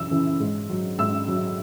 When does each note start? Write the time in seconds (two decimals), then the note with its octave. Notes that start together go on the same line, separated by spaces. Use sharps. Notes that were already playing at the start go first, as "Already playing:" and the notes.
Already playing: F#2 C#3 E3 E6
0.11 C#3 E3
0.40 G#2
0.70 F#3
0.98 G#2 E6
1.28 F#3